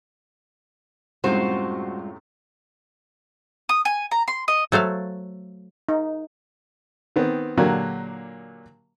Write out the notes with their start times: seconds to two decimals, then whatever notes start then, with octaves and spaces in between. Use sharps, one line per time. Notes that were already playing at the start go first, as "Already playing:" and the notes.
1.24 F#2 A2 C3 G3 G#3 F4 F#4 C5
3.69 D#6
3.85 G#5
4.11 A#5
4.28 C6
4.48 D#5
4.72 F#3 A3 C5 F5
5.89 D#4
7.16 D#3 B3 C4
7.57 A#2 D3 F#3 A#3 G4